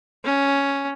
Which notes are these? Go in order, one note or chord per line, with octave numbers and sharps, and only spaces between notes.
C#4